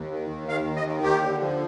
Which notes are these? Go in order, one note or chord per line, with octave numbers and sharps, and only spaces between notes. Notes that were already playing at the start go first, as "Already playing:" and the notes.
Already playing: D#2
D#3
D#2
D#3 F5
D#2
D#5
D#3
D#2 G4
D3
F3